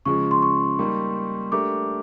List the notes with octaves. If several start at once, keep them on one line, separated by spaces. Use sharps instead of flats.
C#3 F3 G#3 C#6
C6
C#6
G3 A#3 D#4
A3 D4 G4 A#4 D6